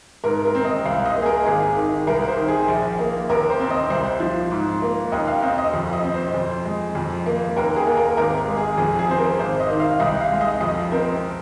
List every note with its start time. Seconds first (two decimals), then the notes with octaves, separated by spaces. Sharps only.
0.24 G#2 A#4
0.45 A#4
0.55 C4
0.65 D#5
0.85 C2 F5
1.06 D#5
1.16 A#3
1.22 G#4
1.26 A#4
1.46 G#1 G#4
1.77 D#3
2.07 C2 A#4
2.28 C5
2.37 D#3
2.48 G#4
2.68 A#1
2.99 A#3
3.29 D#2 A#4
3.50 C5
3.60 C4
3.70 D#5
3.90 C2 C5
4.20 F3
4.51 G#2
4.82 A#3
5.12 D#2 D#5
5.27 F5
5.42 C4 D#5
5.58 D#5
5.73 F2
5.93 D#5
6.04 C4
6.14 C5
6.34 F2
6.65 G#3
6.95 F2
7.26 A#3
7.56 D#2 A#4
7.76 G#4
7.87 A#3
7.97 A#4
8.17 G#1 A#4
8.38 A#4
8.48 G#3
8.57 G#4
8.78 F2 G#4
8.99 G#4
9.08 C4 C5
9.18 A#4
9.39 G#1 C5
9.60 D#5
9.70 D#3
9.80 F5
10.00 C2 D#5
10.20 F5
10.31 G#3
10.41 D#5
10.61 F2 D#5
10.92 C4 A#4